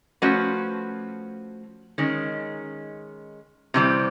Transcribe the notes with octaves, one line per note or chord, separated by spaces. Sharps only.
F3 A3 C#4 F#4 B4
D#3 G#3 C#4
C3 E3 G3